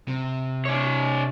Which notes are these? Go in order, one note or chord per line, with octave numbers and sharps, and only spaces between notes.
C3
D4 C#5